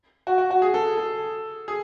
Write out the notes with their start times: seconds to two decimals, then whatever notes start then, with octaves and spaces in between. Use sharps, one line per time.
0.27 F#4
0.38 F#4
0.51 F#4
0.62 G#4
0.74 A4
0.97 A4
1.68 G#4